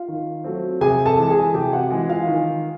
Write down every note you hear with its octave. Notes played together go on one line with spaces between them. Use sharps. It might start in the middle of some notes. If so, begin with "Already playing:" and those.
Already playing: F4 F5
D#3
F#3 A3 C4
C3 G#4 G#5
A4 A5
E3 G#3
G#4 G#5
C3 G4 G5
F#4 F#5
E3 G#3
F4 F5
D#3